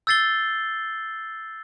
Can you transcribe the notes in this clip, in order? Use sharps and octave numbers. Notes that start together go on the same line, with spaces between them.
E6 G6 A6 C7 G7